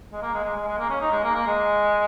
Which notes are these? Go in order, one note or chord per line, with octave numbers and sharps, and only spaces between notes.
G#3
A#3
G#3
G#3
G#3
G#3
A#3
C#4
D#4
G#3
A#3
A#3
G#3